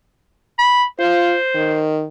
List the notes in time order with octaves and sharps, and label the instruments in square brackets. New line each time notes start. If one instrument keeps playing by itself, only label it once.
[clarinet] B5
[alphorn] F4 [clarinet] C5
[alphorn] D#3